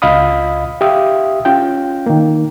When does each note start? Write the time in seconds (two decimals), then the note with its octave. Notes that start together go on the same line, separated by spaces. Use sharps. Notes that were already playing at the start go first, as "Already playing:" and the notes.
0.02 C#2 F4 D#5 F5 B5 D#6
0.81 G4 E5 F5 D#6
1.45 C#4 F4 G5
2.06 D#3 A#3